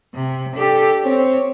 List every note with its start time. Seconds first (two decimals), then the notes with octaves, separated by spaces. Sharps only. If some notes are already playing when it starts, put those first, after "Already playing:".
0.15 C3
0.57 D4 G4 A4
1.05 C4 C#5